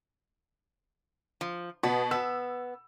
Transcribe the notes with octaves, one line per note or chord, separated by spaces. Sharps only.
F3
B2 B3
B3 E6